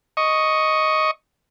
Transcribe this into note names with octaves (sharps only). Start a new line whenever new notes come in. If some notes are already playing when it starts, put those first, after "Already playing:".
D#5 C#6